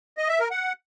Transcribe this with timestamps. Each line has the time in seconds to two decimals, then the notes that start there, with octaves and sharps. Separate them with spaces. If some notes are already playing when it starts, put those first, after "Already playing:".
0.18 D#5
0.29 E5
0.40 A#4
0.51 F#5